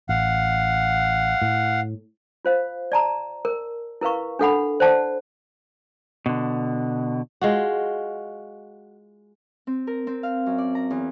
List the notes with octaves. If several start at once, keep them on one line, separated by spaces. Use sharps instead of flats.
A1 F5 F#5
A2
F4 C5 F5
D5 A5 A#5
A#4
E4 A#4 B4 F5 C#6
D4 A4 F#5 B5
C5 D5 F#5 A5
B2 D3
G#3 F4 F#4
C4
A#4
C4
F5
F#2
D5
A#5
E2